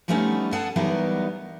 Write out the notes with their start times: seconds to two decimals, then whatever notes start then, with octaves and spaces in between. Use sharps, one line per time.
0.08 F3 G3 A3 B3 C#4 D#4
0.52 G#4 A4 F#5 G#5 A5
0.76 E3 F#3 G3 B3 D#4 A#4